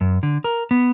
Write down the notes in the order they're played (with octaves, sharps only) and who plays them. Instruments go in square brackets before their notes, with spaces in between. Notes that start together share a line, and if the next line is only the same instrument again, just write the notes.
[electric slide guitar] F#2
D3
A#4
B3